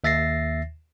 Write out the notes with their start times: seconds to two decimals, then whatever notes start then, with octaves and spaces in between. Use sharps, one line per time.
0.04 D#2 E5 A6 A#6 C7